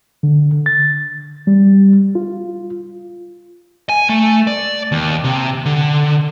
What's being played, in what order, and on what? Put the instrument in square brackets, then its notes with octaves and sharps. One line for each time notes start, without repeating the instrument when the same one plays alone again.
[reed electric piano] D3
A6
G3
F4
[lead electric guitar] G#5
A3
D5
D#2
C3
D3